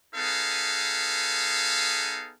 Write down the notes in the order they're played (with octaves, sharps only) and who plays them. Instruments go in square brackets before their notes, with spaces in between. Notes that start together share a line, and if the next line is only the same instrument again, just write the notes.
[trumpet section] B3 D#4 G#4 A4 B4 F5